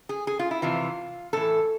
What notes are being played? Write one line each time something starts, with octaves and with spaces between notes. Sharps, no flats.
G#4
G#4
F4
E4
F2 C3 E3 F4
A2 E3 A4